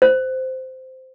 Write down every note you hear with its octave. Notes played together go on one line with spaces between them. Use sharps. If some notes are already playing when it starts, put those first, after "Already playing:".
C5